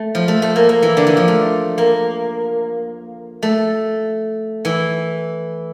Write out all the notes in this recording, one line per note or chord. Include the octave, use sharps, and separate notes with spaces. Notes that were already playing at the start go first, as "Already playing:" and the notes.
Already playing: A3
F3
A3
A3
A#3
A#3
E3
D3
E3
F3
A3
A#3
A3
E3